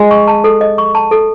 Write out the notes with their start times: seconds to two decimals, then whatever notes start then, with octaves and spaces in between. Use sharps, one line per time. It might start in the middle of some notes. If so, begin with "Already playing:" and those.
Already playing: G#3 D#5
0.11 C#6
0.27 A5
0.44 A4
0.61 D#5
0.78 C#6
0.95 A5
1.11 A4